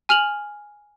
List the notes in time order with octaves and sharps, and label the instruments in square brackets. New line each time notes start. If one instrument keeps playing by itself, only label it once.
[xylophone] G#5 F6 F7 F#7